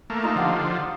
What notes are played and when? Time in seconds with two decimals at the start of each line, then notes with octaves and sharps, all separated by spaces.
0.10 A3 A#3
0.23 D#4 F4
0.36 D3 F3 G4 F#5 A5